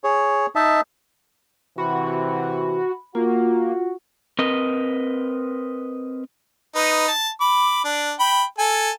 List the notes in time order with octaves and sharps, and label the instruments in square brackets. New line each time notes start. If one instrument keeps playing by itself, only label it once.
[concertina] G#4 C#5
D#4 D#5 E5 A5
[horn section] C3 E3 [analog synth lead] F#4 [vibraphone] B5
[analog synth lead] A#3 [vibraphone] F4 [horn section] F#4
[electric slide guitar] C4 A#4 B4 D#5
[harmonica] D#4 B4
A5
B5 D6
D4
G5 B5
A4 G#5